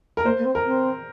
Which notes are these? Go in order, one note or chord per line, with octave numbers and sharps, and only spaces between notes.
A#4
A#3 C5
A#3
C4
A#4
C4